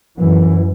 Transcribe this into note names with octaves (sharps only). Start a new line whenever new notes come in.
F#2 E3